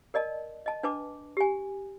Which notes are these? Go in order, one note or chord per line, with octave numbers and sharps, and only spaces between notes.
A#4 D5 D#5 A5
D#5 A5
D4 B4 A5 D6
G4 G#5